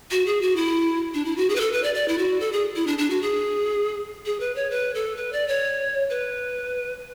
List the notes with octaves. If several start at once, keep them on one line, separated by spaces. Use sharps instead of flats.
F#4
G#4
F#4
E4
D4
E4
F#4
G#4
B4
A4
B4
D5
D5
E4
F#4
A4
G#4
E4
D4
D4
F#4
G#4
G#4
B4
C#5
B4
A4
B4
D5
C#5
B4